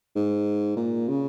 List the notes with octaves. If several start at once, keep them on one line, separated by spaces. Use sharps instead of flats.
G#2
A#2
C#3